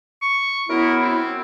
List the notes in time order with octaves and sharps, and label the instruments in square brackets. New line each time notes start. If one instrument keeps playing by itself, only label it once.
[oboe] C#6
[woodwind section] F#2 B3 E4 [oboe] A#4
[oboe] C4